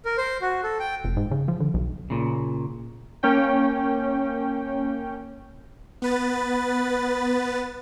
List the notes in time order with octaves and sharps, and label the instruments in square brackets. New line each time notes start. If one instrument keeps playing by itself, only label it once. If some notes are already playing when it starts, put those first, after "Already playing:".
[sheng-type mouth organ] A#4
C5
F#4
A4
G5
[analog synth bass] F1
G#2
C#3
F3
D3
B1
[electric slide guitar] A#2 C#3
[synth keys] A#3 C#4 G5
[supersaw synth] B3 B4 A6